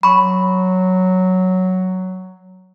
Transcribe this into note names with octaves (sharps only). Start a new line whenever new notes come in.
F#3 B5 C#6